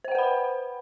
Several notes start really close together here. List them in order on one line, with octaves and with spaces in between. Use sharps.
C5 G5 F#5 B4 B5